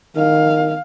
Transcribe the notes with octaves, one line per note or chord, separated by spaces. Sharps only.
D#3 F5